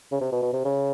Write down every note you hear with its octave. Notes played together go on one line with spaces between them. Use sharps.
C#3
C3
B2
B2
C3
C#3